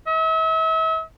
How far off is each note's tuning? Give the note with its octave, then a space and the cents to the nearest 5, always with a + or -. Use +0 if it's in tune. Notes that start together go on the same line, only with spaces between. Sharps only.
E5 -40